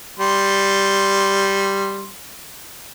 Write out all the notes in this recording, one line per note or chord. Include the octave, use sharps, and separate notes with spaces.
G3 C6